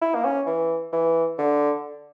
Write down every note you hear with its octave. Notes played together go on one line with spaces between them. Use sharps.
E4
A#3
C#4
E3
E3
D3